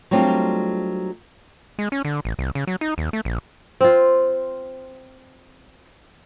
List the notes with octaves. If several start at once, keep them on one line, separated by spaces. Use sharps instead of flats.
F#3 G3 A3 C4 D4 F4
G#3
C#4
D3
A1
C2
C#3
F#3
D#4
D#2
A3
A#1
C4 F4